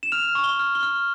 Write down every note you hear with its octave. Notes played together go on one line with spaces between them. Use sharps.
E7
F6 F7
C#6
G7
F6
G7
F6